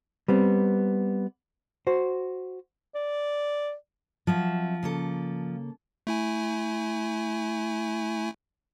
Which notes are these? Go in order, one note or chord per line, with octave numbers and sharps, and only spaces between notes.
G3 B3 C4
F#4 C5
D5
F3 F#3 C4 E5
C#3 A#3 A4
A3 E4 G#5